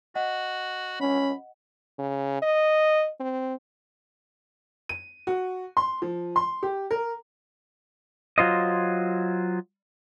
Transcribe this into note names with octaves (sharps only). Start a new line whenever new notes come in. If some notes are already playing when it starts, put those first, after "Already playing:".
F#4 D#5 F#5
C#4 B5
C#3
D#5
C4
D#7
F#4
C6
F3
C6
G4
A#4
F#3 F4 C5 D#5